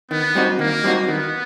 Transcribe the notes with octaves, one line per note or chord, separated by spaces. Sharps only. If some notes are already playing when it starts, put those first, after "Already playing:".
D#3 B3
G3 C4 D#4 F#4
D#3 A#3
G3 C4 D#4 F#4
D#3 B3